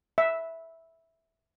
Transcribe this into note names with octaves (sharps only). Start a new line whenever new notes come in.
E5